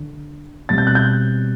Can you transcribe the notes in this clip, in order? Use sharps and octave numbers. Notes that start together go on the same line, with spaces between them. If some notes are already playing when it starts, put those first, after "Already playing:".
Already playing: D3 D4
B2 G3 C4 A6
G6
F#6
G6